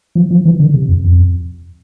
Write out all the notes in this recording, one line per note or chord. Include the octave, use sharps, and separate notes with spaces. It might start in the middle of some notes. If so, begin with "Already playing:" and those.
F3
F3
E3
D3
C3
F2
F2